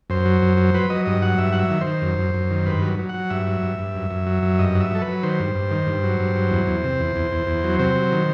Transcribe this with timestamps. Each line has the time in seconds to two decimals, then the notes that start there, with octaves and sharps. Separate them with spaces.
0.10 F#2 C5
0.25 F#3
0.42 F#2
0.57 F#3
0.74 F#3 B4
0.90 F#3 D#5
1.06 G2 D#5
1.22 F#3 F#5
1.38 G2 E5
1.52 F#3 F#5
1.59 E5
1.70 D#3
1.81 C5
1.87 D#3
2.02 F#2
2.18 F#2
2.34 F#2
2.50 D#3
2.66 G2 B4
2.82 F#3
2.99 F#3
3.09 F#3 F#5
3.30 G2 E5
3.46 F#3
3.63 G2
3.79 G2
3.95 F#2
4.11 F#2
4.27 F#3
4.43 F#2
4.59 G2 D#5
4.75 F#3
4.80 E5
4.91 F#3 A4
5.02 B4
5.08 F#3
5.23 D#3 C5
5.40 G2
5.55 G2
5.71 D#3
5.87 G2
6.04 F#3
6.20 G2
6.36 F#3
6.51 E2
6.67 E2
6.84 C3
7.00 E2
7.16 E2
7.31 E2
7.47 E2
7.64 F#3
7.79 C3 C5
7.96 F#3
8.12 D#3